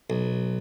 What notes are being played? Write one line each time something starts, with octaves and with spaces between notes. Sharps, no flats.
B1